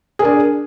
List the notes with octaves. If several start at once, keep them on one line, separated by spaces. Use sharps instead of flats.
D4 G#4 A#4